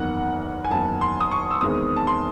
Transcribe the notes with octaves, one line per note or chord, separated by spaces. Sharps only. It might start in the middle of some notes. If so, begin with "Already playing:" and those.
Already playing: F#1 E2 D#3 F#5
G#5
F#1 E2 D#3 A5
C6
D#6
C#6
E6
E2 D#3 G#3 C4 D#6
A5
C6